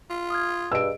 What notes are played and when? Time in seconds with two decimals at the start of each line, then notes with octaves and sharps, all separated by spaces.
0.10 F4
0.30 D#6 F6 G#6
0.72 G2 G#4 D5 D#5 E6 D7